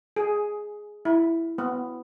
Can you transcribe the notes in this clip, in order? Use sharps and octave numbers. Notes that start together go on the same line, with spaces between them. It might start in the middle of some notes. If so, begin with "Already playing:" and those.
G#4
E4
B3